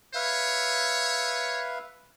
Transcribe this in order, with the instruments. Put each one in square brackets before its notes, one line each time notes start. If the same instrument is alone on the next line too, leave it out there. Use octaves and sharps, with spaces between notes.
[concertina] B4 E5 F5 [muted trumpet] C#5